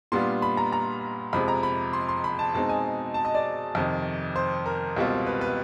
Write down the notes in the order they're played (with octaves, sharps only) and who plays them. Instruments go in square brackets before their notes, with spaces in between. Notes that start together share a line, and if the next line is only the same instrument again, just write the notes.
[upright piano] A#2 G3 B3 D4 F4 C6
B5
A#5
A#5
F2 C3 F3 G#3 B5
A#5
B5
C6
C6
B5
A5
B2 G#3 C4 D#4 A5
G#5
A5
D#5
D5
F2 C3 D#3
C5
A#4
C#2 B2 G3 C4 F4
B4
B4